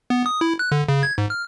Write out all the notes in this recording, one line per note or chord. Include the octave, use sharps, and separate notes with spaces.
B3
D#6
E4
F#6
D3
C#3
G#6
G#2
F6